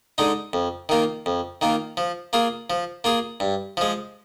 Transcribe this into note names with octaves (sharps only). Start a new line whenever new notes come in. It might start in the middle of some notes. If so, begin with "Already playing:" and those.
D3 G#3 D#4
F2
D#3 A#3 F4
F2
D#3 A#3 F4
F3
A#3 F4 G#4
F3
A#3 F4 G#4
G2
F3 G#3